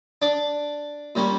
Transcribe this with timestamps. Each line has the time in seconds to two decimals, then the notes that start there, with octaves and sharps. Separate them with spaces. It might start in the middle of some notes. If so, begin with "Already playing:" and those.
0.22 D4 D5
1.15 A#2 G3 C#4